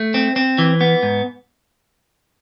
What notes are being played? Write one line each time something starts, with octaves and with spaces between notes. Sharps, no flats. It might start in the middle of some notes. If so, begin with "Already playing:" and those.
Already playing: A3
C4
C4
E3
B3
G#2